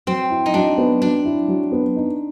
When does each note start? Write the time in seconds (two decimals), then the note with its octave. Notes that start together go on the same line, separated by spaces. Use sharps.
0.07 F#3 C4
0.30 E4
0.46 D#4
0.54 F#3 D4
0.78 B3
1.02 F#3 D4
1.25 E4
1.48 F#3
1.72 B3
1.96 D#4